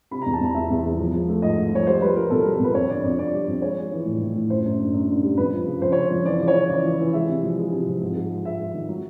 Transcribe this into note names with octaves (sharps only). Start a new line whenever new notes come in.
C3 B5
E2 A#5
A5
E2 A#5
E2 E5
E2
E2
F3
F3
A3
G#2 D#5
G#2
F3 C#5
G3 C5
G3 B4
G3 A#4
B2 A4
A#4
G3
A#4
B2 B4
F2 C#5
D3 D5
F2 D5
F2 D5
G3
F2
G#3 C#5
G#3
E3
A2
A2
A2
F#2 C5
F#2
D3
F#2
D3
G3
F2 B4
F3
C#3
F2 C5
C#3 C#5
F3
E3 D5
C#3
C#5
C#3
E3 D5
E3
E3
G#3 E5
C3
F3
G#3
C3
F3
G#2
G#2
G#3
G#2 E5
G#2
D#3
F#3